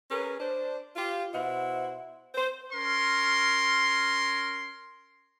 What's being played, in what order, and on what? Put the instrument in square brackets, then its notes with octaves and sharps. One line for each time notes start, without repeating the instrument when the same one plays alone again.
[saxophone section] C#4 G#4 A#4 B4
D4 C5
F4 G4
B2 E4 C5 F#5
C5
[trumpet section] C#4 A#4 C6